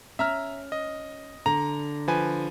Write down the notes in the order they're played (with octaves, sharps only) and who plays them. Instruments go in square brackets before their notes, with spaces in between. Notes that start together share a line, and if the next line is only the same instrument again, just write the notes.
[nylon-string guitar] C#4 [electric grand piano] E5 A#5 F6
[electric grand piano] D#5
[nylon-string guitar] D3 [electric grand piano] A#5
[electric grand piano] F3 B4 G#5